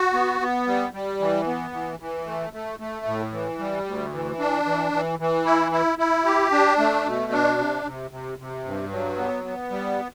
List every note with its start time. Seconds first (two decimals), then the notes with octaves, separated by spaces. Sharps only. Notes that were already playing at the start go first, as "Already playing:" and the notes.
Already playing: F#4
0.13 B3
0.40 B3
0.67 G3
0.93 G3
1.20 E3
1.47 B3
1.73 E3
2.00 E3
2.26 A3
2.53 A3
2.79 A3
3.06 A2
3.32 E3
3.59 G3
3.86 D2
4.13 E3
4.39 D4
4.66 E3
4.92 E3
5.19 E3
5.45 E4
5.72 E4
5.99 E4
6.25 G4
6.52 D4
6.79 A3
7.06 B2
7.32 D4
7.58 C3
7.85 C3
8.11 C3
8.39 C3
8.65 G2
8.91 F#3
9.18 B3
9.44 B3
9.70 G3